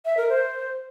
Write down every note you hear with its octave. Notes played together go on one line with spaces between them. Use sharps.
E5
A#4
C5